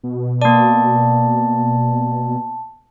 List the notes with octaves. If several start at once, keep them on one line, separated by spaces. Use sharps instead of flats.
B2
A#3 D5 A5